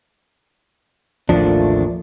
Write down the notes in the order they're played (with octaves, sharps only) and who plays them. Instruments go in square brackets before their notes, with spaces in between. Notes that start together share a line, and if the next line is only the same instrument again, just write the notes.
[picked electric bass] A1 D#2 F3 [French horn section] A3 A#3 F4 [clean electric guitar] D4